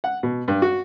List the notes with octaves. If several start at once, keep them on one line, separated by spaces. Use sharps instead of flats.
F#5
B2
G2
F#4